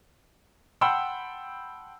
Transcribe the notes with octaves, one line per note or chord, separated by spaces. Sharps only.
F#5 G5 A5 B5 C6 E6